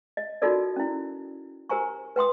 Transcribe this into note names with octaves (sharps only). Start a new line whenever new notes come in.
D#5
D#4 F4 F#4 A4 A#4 D5
C#4 E4
G4 A#4 C5 G#5 A#5 C#6
B4 G5 C6 D#6